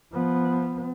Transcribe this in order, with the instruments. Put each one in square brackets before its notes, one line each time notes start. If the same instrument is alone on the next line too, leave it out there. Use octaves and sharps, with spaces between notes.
[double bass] F3 B3